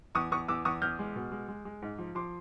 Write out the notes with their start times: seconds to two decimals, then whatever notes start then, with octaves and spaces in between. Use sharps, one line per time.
0.15 E2 C#6 D#6
0.31 E2 C#6 D#6
0.48 E2 D6 E6
0.65 E2 C#6 D#6
0.82 E2 F6 G6
0.99 G#3
1.16 B2
1.32 G#3
1.48 G#3
1.65 G#3
1.82 G#2
1.98 F3
2.15 F3 C6 D6